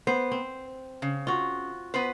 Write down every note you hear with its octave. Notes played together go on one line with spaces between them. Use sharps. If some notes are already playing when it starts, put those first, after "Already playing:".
B3 C5
C4
C#3
F4 F#4
B3 B4 C5